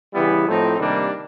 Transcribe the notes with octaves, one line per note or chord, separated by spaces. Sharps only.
C#3 E3 G3 B3 E4
A2 F3 A3 C4 D#4
C3 D#3 G3 A#3 D4